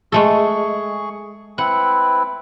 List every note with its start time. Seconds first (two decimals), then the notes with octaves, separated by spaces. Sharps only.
0.12 G#3 A3 G#4 A4 C#6
1.58 C4 E4 B4 F#5